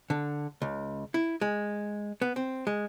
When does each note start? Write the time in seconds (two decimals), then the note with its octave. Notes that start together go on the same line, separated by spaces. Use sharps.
0.10 D3
0.62 C#2
1.14 E4
1.41 G#3
2.21 B3
2.36 C4
2.67 G#3